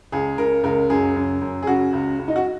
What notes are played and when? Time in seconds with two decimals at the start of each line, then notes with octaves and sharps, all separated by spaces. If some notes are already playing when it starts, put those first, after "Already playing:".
0.12 C#2 G#4
0.38 C#3 A#4
0.64 C#2 A#4
0.90 F#2 G#4
1.16 F#2
1.41 F#2
1.62 G#4
1.67 C#3 F#4
1.93 C#2
2.19 C#2
2.28 D#4
2.36 F#4